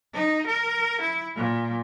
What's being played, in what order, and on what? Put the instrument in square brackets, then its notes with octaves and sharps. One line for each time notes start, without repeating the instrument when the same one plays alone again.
[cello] D#4
A#4
E4
A#2